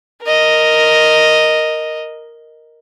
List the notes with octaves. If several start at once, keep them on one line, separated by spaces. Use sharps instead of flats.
A#4 D#5